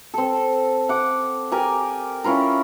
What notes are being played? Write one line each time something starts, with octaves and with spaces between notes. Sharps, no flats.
C4 A4
F#5 D6
G4 A#4 D5 G#5
C#4 E4 F4 A#4